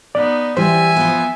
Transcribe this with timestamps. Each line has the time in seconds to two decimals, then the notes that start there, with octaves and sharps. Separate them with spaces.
0.15 B3 D#4 D5
0.57 E3 G3 C5 E5 G#5
0.96 F3 B3